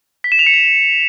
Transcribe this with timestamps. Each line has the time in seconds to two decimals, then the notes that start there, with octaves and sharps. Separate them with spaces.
0.24 B6
0.32 E7
0.39 F7
0.47 C#7
0.54 F7